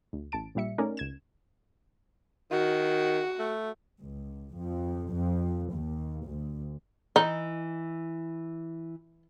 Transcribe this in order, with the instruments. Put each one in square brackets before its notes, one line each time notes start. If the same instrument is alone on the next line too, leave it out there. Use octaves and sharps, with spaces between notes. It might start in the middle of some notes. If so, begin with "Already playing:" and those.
[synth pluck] D2
A1 A5 D7
A#1 A#2 G3 E5 C#7
A3 C#4 D#4 A#4 D5
C#2 G#6 E7
[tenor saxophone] D#3 [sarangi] F#4
[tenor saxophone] A3
[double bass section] C#2
F2
F2
D#2
D2
[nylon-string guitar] E3 [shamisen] D#4